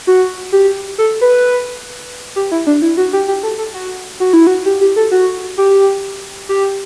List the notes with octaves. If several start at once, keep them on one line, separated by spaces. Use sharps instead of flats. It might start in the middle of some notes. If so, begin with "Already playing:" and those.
F#4
G4
A4
B4
G4
E4
D4
E4
F#4
G4
G4
A4
A4
F#4
F#4
E4
F#4
G4
G4
A4
F#4
G4
G4